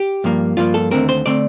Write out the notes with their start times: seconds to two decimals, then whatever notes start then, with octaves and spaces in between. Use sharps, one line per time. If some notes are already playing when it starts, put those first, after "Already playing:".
Already playing: G4
0.24 G2 F3 A#3
0.57 G2 F3 A#3 F4
0.74 A4
0.91 D#2 D3 A3 C4 A#4
1.09 C5
1.26 D3 A3 C4 D5